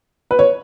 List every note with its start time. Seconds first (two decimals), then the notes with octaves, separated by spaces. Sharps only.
0.31 B4
0.39 C#5